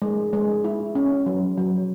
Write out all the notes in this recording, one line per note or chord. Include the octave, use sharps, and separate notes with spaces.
G#3
G#3
E4
C#4
F#3
F#3